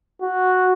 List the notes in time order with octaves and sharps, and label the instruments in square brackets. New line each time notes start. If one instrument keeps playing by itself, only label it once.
[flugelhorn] F#4